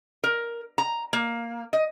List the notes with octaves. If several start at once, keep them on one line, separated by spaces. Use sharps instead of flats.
A#4
A#5
A#3
D#5